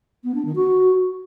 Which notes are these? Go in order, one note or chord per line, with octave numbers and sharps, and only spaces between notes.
B3
D4
D#3
F#4